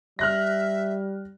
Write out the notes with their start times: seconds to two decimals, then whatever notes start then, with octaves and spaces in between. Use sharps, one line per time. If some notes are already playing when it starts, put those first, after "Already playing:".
0.19 G3 E5 F6 F#6 A#6